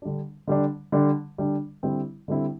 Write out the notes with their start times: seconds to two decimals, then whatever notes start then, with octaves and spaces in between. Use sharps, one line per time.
0.02 D3 G3 D4
0.47 D3 G3 D4
0.92 D3 G3 D4
1.38 D3 G3 D4
1.83 D3 G3 C4 E4
2.28 D3 G3 C4 E4